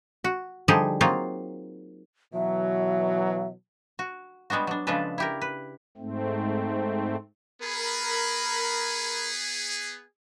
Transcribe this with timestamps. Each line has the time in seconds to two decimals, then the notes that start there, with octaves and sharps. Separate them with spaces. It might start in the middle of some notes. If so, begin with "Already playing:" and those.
0.24 F#4
0.68 D3 F3 G3 D#4 G4 G#4
1.01 F#3 A#3 C4 D#4 F4
2.34 B2 E3 F#3 E5
3.99 F#4
4.50 G3 G#3 B3 D4 F#4
4.67 F#3 D4
4.87 C#3 F3 G#3 D4 A4 B4
5.18 E4 G4 A#4
5.41 B4
5.97 G#2 A3 C4
7.62 B3 G#4 A#4 B5